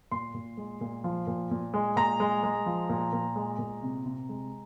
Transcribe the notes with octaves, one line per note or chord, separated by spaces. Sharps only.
A#2 C6
A#2
G#3
A#2
F3
A#2
A#2
G#3
A#2 A#5
G#3
G#3
F3
A#2
A#2
G#3
A#2
C3
C3
G#3